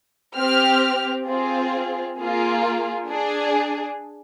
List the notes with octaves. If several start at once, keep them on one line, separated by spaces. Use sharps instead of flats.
C4 G4 F6
C4 F4 G#4
A#3 F4 G#4
D4 G#4